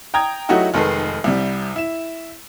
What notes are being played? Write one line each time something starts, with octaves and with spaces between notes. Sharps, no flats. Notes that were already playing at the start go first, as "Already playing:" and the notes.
G5 A#5 D#6 G#6
F#3 A3 D#4 E4 F#4 G4
F1 D#3 G#3 A4 B4 C7
C2 C3 G3
E4 E7